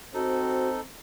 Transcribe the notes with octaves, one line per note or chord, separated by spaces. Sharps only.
C4 D#4 F#4 A4 C5